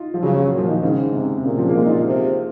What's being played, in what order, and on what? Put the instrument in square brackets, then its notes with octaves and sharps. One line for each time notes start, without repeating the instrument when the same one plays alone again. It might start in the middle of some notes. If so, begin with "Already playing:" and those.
Already playing: [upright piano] D#4 F4
F3
[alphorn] C#3 [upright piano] F#3
[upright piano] F#3
[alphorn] A#2
[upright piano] F3
D#3
[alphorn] G#2 [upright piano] C#3
[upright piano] C#3
C3
C3
[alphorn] A#2 [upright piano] C#3
[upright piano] F3
A#3
[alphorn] A#2 [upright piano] G#3
[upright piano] D#4
F4
[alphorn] C3